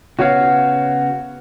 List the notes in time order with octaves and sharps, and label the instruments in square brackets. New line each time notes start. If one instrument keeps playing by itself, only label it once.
[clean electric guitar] C#3 B3 F5 [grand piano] F#4 C#5